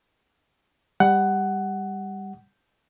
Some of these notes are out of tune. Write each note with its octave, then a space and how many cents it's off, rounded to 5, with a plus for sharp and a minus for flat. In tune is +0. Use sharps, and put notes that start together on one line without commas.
G3 +15 F#5 +15